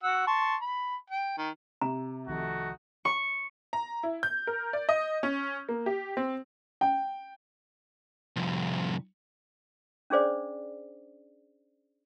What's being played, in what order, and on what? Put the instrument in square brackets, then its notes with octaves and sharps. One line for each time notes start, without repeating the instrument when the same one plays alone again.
[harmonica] F#4 F#5 E6
A5 C6 C#6
B5
G5
D#3
[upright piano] C3 [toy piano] A#5
[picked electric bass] C2 D#3 F3 [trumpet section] A3 D#4 F#4
[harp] C#6
[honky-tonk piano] A#5
E4
G6
A#4
D5
D#5
C#4
A#3
G4
C4
[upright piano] G5
[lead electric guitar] C2 F2
[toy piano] C#4 D4 G#4 C5 D5